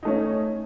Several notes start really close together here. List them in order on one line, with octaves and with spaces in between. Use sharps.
D#4 A3 C#4